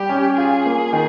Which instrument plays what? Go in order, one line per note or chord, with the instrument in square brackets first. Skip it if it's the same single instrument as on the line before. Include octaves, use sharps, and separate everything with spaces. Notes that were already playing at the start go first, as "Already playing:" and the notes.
Already playing: [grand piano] G3 [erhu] G4
[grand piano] C#4
[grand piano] F4 [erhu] G#4
[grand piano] A#3
D#3